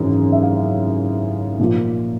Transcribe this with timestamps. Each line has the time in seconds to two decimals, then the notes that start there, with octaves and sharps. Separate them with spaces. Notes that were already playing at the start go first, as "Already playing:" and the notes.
Already playing: G#1 F#2 C#3 E3 G#3
0.32 E5
0.43 F5
1.59 A#2 F3 A#3